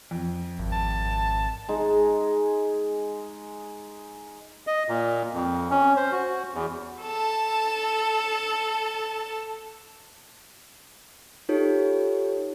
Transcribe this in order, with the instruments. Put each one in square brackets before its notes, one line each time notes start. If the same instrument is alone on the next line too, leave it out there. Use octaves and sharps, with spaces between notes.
[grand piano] F2
[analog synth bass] G#1
[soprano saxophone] A5
[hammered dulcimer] G#3 D#4
[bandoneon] D#5
A#2
F2
C#4
C5
F#4
E2
[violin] A4 A5
[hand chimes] D#4 F4 G4 A4 C#5